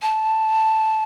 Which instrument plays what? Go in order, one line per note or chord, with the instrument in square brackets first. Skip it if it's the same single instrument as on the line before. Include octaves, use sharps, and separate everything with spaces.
[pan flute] A5